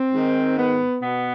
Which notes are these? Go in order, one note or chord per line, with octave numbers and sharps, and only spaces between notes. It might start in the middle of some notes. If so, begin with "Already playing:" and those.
Already playing: C4
G#2 D#3
B3
B2 B3